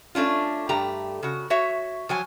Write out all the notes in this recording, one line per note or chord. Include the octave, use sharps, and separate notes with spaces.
A3 C#4 D4 F4
G2 A3 G4 A#5
C#3 F#4
F#4 C#5 E5
F3 F#3 G#5